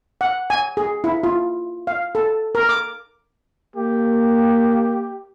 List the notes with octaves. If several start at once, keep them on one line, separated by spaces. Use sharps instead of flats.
F#5
G#5
G#4
E4
F4
F5
A4
A#4
D6
A#3 G4